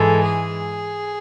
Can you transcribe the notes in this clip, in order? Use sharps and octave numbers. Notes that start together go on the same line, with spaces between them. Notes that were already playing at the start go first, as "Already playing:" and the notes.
Already playing: G#2 E3 G#3 A4
G#4